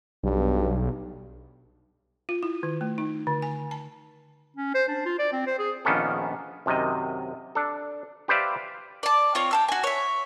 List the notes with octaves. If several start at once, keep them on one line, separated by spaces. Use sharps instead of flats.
B1 G2
F4
E4
D#3
A3
D#4
D3
G#5
A5
C#4
C5
D4
F4
D5
C4
C5
G#4
A#1 D#3 A#3 B3 C#4 A4
F#2 C3 D#3 D#5
D4 A4
G4 B4 C5 D5 E5 F5
D5 A5
C4 F4 C#5
G5 A5 E6
F#4 G#5
C#5 E5